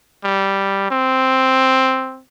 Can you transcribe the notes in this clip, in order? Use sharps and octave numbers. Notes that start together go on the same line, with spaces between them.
G3
C4